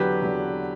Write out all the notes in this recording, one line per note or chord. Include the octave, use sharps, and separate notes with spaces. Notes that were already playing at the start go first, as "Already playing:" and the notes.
Already playing: E2 D3 F#3 G4 B4
E2 D3 F#3